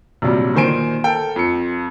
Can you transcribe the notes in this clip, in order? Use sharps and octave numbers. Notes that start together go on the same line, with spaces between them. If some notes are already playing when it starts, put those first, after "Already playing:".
A#1 C3 F#3 G3
A#2 D#3 C5 G#5 D7
A4 A#4 G5
F2 C#7